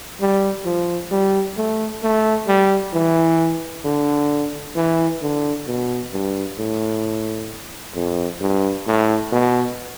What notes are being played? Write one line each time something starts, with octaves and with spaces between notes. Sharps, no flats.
G3
F3
G3
A3
A3
G3
E3
D3
E3
D3
B2
G2
A2
F2
G2
A2
B2